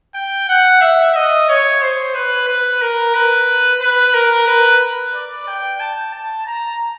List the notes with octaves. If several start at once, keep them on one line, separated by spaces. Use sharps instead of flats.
G5
F#5
E5
D#5
C#5
C5
B4
B4
A#4
B4
B4
A#4
B4
D5
G5
A5
A5
A#5